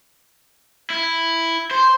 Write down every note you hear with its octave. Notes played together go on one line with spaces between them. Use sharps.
E4
C5